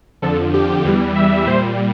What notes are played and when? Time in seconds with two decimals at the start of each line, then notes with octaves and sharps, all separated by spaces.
0.22 F2 D3 F3 A4
0.54 G4
0.84 E2 E3 G3
1.15 E5
1.46 A#2 G3 C5